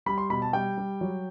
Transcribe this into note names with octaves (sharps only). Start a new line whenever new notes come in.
G3 B5
C6
B2 B5
A5
G3 G5
G3
F#3